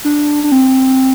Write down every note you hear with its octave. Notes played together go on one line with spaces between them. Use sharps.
D4
D4
C4